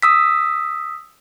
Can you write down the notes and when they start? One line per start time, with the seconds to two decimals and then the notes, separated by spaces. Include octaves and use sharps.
0.02 D#6 E6 B6